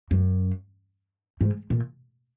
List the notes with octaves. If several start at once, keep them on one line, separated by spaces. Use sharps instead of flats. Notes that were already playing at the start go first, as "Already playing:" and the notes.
F#2
G#2
A#2